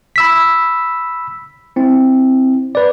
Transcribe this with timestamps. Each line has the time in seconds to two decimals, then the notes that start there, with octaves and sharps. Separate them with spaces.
0.16 B5 E6 B6
1.76 C4 E4
2.75 B4 D5